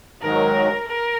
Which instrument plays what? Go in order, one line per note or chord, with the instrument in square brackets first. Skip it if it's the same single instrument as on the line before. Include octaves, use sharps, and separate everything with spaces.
[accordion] G#2 D#3 F#3 [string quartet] A#4
[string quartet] A#4